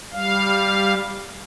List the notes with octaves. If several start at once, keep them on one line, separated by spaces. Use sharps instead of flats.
G3 F5